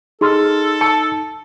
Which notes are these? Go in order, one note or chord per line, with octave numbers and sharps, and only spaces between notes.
D#4 G#4 A4 C6 F6
A5 C#7